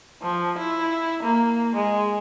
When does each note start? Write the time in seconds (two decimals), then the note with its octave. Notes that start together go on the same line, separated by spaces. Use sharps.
0.22 F3
0.58 E4
1.23 A#3
1.76 G#3